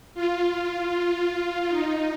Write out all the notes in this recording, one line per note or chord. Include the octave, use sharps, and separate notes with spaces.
F4
D#4